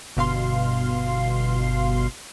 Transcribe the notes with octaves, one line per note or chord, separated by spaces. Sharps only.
G1 B2 F5 C6